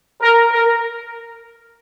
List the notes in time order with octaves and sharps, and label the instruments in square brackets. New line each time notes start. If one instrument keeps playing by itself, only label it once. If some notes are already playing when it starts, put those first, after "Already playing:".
[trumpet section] A#4
A#4